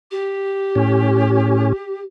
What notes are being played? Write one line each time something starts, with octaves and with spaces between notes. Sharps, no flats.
G4
A2 C#4